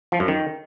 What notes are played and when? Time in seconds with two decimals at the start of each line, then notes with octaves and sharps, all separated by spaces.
0.12 F3
0.20 F#2
0.28 D#3